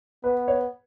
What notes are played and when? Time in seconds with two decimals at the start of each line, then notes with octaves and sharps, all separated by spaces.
0.24 B3 B4
0.48 C#5